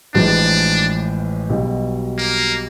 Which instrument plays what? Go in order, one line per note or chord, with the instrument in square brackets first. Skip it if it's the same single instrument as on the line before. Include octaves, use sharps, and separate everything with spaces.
[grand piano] A1 A2 F3 G#3 [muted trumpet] D4
[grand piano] B1 B2 G3
[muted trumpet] A#3